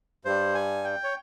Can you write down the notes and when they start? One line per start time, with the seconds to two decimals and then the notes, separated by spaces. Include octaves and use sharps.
0.25 G2 G3 C5
0.55 G#5
0.84 G5
1.04 C#5